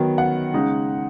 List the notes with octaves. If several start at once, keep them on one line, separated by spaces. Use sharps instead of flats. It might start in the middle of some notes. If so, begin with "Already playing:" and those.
Already playing: D#3 F#3 B3
F#5
C#3 G#3 D#4